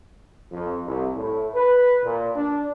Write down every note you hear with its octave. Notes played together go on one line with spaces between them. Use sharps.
F2
C2
A2
B4
A#2
D4